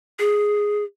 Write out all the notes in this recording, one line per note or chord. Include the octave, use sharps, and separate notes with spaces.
G#4